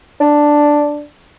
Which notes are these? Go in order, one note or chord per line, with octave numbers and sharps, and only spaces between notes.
D4